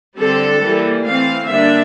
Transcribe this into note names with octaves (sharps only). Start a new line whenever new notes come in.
D3 G3 C4 A4
E3 G3 A#3
E3 A3 C4 F5
D3 G3 A#3 D4 E5